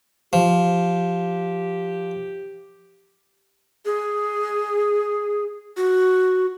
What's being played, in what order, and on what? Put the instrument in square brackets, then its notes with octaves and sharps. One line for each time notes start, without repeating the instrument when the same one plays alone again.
[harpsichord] F3 [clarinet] G4
[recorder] G#4
F#4